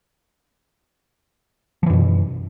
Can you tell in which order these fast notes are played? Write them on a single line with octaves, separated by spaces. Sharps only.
F3 E3 F#2 B2